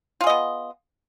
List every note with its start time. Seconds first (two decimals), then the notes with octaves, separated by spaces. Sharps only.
0.21 F4
0.24 G#4
0.27 D#5
0.30 B3